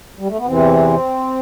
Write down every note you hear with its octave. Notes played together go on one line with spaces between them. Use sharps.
G3
A3
B3
E2 C3 E3 C4